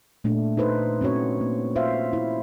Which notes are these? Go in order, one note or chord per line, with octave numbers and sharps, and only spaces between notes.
A#2 A3 D4
D#4 A4 B4 C5
C4 C#4 F#4 C#5
A#3
F4 C5 E5 F5
E4